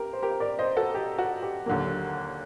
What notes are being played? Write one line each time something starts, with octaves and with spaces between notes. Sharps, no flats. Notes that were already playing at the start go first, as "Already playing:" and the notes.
Already playing: G4 A#4
C5
G4 A#4
A#4 D5
C5 D#5
F#4 A4
G4
F#4
G4
D#2 D3 F#3 A#3